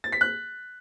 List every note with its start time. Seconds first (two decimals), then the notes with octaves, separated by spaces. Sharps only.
0.04 A6
0.12 B6
0.21 F#6